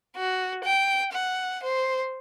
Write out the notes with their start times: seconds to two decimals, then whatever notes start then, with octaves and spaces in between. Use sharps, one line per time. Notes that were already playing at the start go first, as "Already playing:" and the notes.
0.17 F#4
0.65 G5
1.13 F#5
1.64 C5